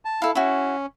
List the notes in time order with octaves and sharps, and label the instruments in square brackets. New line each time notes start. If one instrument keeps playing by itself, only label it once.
[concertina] A5
[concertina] E4 [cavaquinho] A4 F5
[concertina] C#4 [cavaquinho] E4 F#4